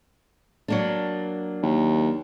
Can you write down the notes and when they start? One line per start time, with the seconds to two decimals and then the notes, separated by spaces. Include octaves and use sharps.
0.68 F#3 A#3 D4
1.63 D#2